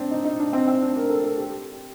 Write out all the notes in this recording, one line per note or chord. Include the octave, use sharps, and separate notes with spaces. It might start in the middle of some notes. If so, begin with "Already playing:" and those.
Already playing: C4 D4
D#4
D#4
D4
C4
C4
D4
A#4
A4
A4
G4